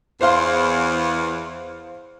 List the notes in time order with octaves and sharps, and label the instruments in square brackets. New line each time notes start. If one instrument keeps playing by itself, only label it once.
[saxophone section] E2 [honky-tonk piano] C5 F5 C6